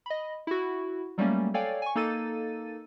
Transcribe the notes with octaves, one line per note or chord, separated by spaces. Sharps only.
D#5 B5
E4 F#4
F#3 G3 A3 A#3 C#4
A4 C#5 D5 F5 G5 G#5
G#5 C#6
A#3 D#4 A4 E6 A6 D#7